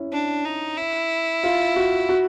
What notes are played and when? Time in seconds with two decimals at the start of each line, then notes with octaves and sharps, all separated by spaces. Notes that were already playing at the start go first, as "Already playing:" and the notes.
Already playing: C#4 E4
0.12 D4
0.45 D#4
0.77 E4
1.44 F4
1.76 F#4
2.09 F#4